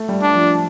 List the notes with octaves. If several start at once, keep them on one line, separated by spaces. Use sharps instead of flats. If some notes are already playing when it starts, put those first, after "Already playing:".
Already playing: A3
G3
D4
F3